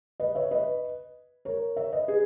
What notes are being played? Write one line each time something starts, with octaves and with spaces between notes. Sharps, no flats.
B4 D#5
C#5 E5
B4 D#5
A#4 C#5
C#5 E5
B4 D#5
G#4 B4